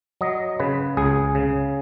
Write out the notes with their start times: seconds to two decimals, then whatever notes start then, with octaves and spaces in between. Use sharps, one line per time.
0.21 F#3 D#5
0.60 C#3 B4
0.97 C#2 G#4
1.35 C#3